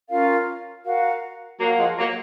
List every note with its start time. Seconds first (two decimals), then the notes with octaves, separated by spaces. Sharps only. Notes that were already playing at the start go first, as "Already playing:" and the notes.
0.09 C#4 F4 A#4 F5
0.84 F#4 A#4 F5
1.59 F#3 A#3 F#4 A#4 F5
1.78 F3 G#3
1.98 F#3 A#3